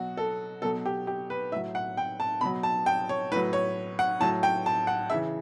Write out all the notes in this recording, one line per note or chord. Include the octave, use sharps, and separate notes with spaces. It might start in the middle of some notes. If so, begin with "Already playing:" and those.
Already playing: B2 F#3 F#4
A4
B2 F#3 A4
G4
G4
B4
A2 F#3 E5
F#5
G5
A5
B2 F#3 B5
A5
G5
C#5
A2 F#3 B4
C#5
F#5
A2 F#3 A5
G5
A5
F#5
C#3 E3 E5